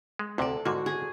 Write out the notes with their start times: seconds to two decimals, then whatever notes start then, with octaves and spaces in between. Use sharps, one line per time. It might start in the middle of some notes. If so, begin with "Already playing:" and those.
0.19 G#3
0.38 D2 C3 A4 D5
0.65 G#2 D3 A#3 F#4
0.86 G#4